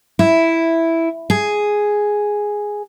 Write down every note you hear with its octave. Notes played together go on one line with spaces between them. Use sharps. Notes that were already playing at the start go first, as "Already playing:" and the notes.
E4
G#4